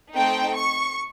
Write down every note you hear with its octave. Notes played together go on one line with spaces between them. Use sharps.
A3 C4 D#4 G5
C#6